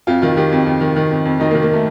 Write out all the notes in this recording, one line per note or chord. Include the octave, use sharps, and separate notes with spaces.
F2 F4
D#3 F4
D#3 G4
F2
F2
D#3
D#3
F2
F2
D#3 D#4
A#3
D#3
A#3
A3